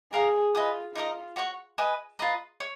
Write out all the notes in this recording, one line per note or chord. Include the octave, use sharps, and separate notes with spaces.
G#4 A#4 F5 A#5
F4 B4 D#5 G#5 D#6
D#4 F4 A#4 D#5 A#5
F#4 C#5 F#5 C#6
B4 D#5 G#5 D#6
F4 B4 D#5 A#5
C#5